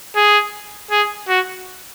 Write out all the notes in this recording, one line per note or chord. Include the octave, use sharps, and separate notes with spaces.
G#4
G#4
F#4